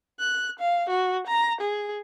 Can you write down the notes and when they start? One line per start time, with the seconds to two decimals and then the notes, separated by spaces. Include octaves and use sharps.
0.20 F#6
0.59 F5
0.90 F#4
1.27 A#5
1.61 G#4